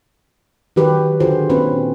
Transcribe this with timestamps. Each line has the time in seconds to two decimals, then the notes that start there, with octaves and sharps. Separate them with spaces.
0.76 D#3 F#3 F#4 G4 B4
1.20 D3 F4 F#4 G#4 C5
1.49 A#2 C4 C#4 B4